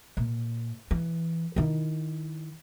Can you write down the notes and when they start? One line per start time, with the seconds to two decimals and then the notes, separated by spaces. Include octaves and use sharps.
0.17 A#2
0.91 E3
1.56 D#3 E4